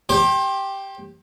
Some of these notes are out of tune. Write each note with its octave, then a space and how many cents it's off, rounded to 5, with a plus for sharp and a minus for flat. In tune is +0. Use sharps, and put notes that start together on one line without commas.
G4 +0 C5 +30